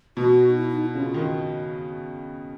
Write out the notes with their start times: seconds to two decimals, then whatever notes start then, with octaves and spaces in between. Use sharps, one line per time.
0.17 B2 F#4
0.48 D#4
0.56 E4
0.69 D#4
0.82 E4
0.95 C#3 F4
1.14 D#3